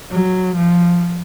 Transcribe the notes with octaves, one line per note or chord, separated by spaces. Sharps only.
F#3
F3